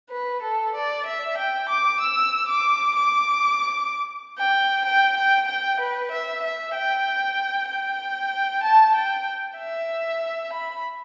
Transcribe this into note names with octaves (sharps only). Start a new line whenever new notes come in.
B4
A4
D5
E5
G5
D6
E6
D6
D6
G5
G5
G5
G5
B4
E5
E5
G5
G5
A5
G5
E5
B5